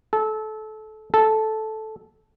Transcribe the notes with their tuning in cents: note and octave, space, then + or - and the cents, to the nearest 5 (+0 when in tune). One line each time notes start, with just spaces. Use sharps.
A4 -25
A4 -10